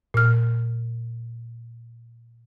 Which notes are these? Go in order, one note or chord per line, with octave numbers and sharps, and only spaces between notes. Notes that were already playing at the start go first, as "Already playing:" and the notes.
A#2 F6